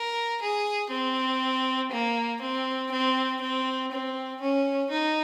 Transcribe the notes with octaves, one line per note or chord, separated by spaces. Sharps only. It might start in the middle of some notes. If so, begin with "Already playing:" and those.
Already playing: A#4
G#4
C4
A#3
C4
C4
C4
C4
C#4
D#4